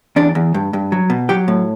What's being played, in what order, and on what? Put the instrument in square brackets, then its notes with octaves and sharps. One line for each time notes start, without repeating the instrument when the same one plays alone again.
[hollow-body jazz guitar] E2 D4
E2
G2
G2
F#3
B2
F#3 G4
A2